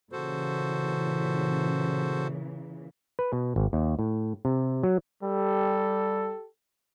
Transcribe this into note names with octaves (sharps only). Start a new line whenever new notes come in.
A#2 C#3 E3 F#4 A4 C5
B4
B2
G#1
D#2
A2
C3
F#3
G3 G4 A4